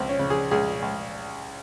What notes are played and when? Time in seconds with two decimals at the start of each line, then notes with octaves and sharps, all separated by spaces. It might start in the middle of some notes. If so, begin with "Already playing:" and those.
Already playing: C#2 C4
0.09 C#4
0.19 C#3
0.30 G#4
0.51 C#2 G#4
0.82 C#2